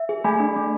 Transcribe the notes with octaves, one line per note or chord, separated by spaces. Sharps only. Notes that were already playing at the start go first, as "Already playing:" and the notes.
Already playing: E5
G#4
A3 G#5 B5
D4
A3